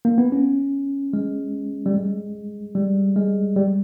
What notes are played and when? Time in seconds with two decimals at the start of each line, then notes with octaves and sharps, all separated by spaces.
0.05 A#3
0.18 B3
0.32 C#4
1.13 G#3
1.86 G3
1.94 G#3
2.75 G3
3.16 G#3
3.56 G3